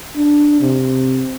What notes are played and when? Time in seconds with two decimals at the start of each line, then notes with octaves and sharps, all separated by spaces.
0.16 D4
0.61 C3